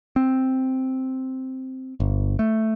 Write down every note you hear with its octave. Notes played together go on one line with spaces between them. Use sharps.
C4
G1
A3